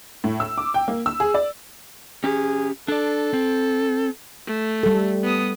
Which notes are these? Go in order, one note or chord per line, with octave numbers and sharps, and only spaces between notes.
A2
E6
D6
G5
A#3
E6
G#4
D5
C#4 G4 G#4
D4 A4 D5
C4
A3
G3 A4
B3 D#6